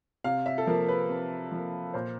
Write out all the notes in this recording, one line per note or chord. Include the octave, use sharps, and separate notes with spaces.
C3 F5
E5
A4
F3 A#3 A#4
B4
C3
F3 A#3
A#2 C5